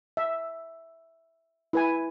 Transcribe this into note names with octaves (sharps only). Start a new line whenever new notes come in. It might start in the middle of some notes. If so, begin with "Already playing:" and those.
E5
E4 B4 G#5